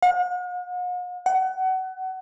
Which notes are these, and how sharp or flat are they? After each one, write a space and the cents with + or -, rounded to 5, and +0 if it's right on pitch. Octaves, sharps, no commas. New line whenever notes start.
F#5 -45
F#5 +25